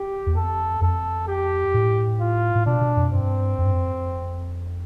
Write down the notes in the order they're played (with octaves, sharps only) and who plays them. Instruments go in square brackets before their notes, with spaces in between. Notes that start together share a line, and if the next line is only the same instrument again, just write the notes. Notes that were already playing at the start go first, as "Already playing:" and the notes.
Already playing: [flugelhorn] G4
[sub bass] E2
[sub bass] F2 [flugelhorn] A4
[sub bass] F2 [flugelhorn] A4
[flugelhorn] G4
[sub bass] A2
[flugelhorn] F4
[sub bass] A2
[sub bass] B2 [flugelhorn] D4
[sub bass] B2
F2
[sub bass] G2 [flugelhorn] C4
[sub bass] F2
G2
F2